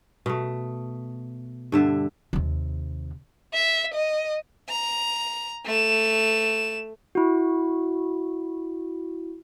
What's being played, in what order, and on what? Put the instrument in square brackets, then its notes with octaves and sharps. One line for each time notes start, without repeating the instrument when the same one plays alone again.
[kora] B2 A3
G2 D3 E5
[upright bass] D#2 C3
[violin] E5
D#5
A#5
A3 E7
[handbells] E4 F#4